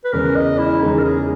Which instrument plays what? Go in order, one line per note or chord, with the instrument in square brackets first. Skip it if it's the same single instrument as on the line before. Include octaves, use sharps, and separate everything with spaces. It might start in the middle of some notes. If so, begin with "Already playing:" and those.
[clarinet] B4
[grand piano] E2 C#3 G#3 C#4 [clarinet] A#4
[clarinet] D#5
E4
[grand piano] E2 C#3 G#3 C#4 [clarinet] D#4
[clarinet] A#4
G#4